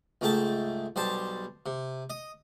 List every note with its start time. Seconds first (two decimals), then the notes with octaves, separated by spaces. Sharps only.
0.21 C#2 G#2 A3 G5 A5
0.96 B1 G3 C5 A5
1.66 C3
2.10 D#5